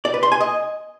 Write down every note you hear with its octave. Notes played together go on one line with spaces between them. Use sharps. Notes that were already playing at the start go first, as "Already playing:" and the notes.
D5
B4
C6
G#5
D#5